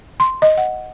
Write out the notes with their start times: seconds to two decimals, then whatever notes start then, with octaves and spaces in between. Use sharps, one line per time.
0.20 C6
0.42 D#5
0.57 F#5